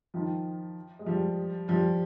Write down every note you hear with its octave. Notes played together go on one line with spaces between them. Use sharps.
D#3 F3
G#3
F3 G3
F3 G3